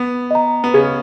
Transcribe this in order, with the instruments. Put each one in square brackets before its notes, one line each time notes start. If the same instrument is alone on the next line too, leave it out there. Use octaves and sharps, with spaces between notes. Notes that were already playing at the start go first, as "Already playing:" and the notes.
Already playing: [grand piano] B3
[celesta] D#5 A#5
[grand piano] B3
[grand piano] C#3 C#4 [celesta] G#4